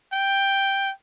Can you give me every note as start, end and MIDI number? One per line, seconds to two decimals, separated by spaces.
0.13 0.91 79